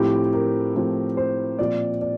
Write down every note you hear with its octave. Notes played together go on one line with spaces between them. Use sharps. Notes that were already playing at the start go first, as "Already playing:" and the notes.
Already playing: A2 F3 C4 G4
A#4
A2 F3 C4
C5
A#2 F3 C4 D5
D5